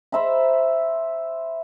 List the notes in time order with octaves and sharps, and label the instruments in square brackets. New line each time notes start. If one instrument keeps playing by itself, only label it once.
[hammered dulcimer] C5 E5 A#5 B5